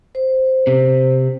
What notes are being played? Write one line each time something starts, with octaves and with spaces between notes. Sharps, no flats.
C5
C3